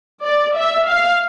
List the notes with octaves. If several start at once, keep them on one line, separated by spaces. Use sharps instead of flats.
D5
E5
F5